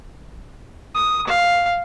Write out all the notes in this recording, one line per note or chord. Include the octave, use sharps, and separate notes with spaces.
D#6
F5